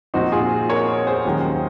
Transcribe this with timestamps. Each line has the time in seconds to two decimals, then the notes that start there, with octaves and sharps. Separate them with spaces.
0.14 A#2 F3 C4 D#4 F#4
0.32 F4 G#4
0.70 A#4 C#5
1.07 G#4 C5
1.25 D#2 D#3 F#3 C#4